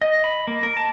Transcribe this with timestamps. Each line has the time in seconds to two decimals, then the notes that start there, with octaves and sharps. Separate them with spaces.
0.01 D#5
0.24 B5
0.47 A#3
0.63 A#4
0.77 A5